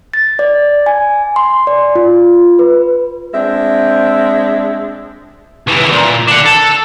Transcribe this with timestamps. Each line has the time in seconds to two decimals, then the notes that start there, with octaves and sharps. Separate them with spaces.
0.14 A6
0.39 D5
0.86 G#5
1.36 C6
1.67 D5
1.95 F4
2.59 B4
3.33 G#3 C4 D4 E5
5.67 C#2 E3
5.91 A#2
6.27 D4 F#5
6.45 A4